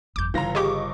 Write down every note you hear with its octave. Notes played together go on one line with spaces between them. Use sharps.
G1 F2 D6 G6
G1 C#3 E3 F4 A#5 A#6
G4 G#4 D#5 C#6 D6